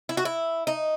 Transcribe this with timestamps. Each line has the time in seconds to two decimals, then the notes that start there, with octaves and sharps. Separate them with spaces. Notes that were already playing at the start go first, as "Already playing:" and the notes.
0.09 E4
0.17 F#4
0.25 E4
0.67 D#4